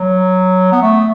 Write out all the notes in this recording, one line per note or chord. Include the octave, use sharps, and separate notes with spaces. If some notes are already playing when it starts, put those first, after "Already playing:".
Already playing: F#3
B3
A3